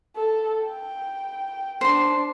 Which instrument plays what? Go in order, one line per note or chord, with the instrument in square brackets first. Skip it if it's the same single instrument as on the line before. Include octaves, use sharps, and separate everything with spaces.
[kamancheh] A4
G5
[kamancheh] D4 [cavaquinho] C5 C6